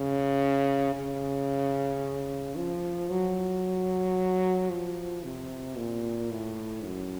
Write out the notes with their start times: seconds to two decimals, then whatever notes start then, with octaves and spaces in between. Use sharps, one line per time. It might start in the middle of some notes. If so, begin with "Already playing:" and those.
Already playing: C#3
0.95 C#3
2.56 F3
3.10 F#3
4.70 F3
5.24 C3
5.77 A#2
6.31 A2
6.84 F#2